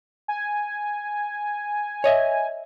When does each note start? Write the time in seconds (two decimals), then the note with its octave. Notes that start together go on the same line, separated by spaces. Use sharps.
0.28 G#5
2.04 C#5 D#5 E5